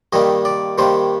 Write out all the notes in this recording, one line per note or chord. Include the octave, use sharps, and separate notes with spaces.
G2 D#3 G3 A#3 D#5
D5
G2 D#3 G3 A#3 C5